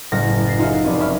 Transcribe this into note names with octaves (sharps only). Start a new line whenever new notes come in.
F#1 A2 F#5 F6 A#6
A6 A#6 C7
D#4 F4 F#4 G#4 E5 F5
F1 C#4 D5 B5
E5 B5 C#6 F6